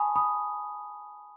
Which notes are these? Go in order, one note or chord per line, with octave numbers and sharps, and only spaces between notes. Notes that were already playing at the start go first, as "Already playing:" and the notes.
Already playing: G#5 A5 B5 C#6 D#6
B5 D#6